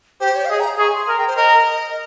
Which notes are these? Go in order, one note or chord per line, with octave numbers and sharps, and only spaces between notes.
G4 C5
C#5
F5
G#4 D#5
A#5
G#4 C#6
C6
A#4
G5
C5
A#4 D#5